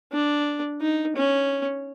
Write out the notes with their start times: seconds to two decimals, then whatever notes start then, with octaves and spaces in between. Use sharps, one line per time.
0.13 D4
0.81 D#4
1.16 C#4